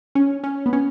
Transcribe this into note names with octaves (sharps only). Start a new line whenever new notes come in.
C#4
C#4
B3
C#4